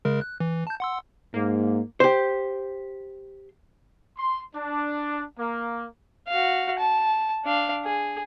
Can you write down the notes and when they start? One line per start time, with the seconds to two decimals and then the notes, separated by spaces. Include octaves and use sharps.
0.05 C#3 G#3 A#4
0.21 F#6
0.40 E3
0.67 A5 G6
0.80 F#5 C6 E6
1.34 G#2 A#3
2.00 G4 C5
4.18 C6
4.56 D4
5.38 A#3
6.28 F#4 F5
6.79 A5
7.44 D4 F5
7.85 G#4